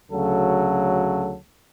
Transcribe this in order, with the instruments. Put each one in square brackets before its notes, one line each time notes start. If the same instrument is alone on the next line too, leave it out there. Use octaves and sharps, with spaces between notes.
[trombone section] D2 C#3 F#3 A4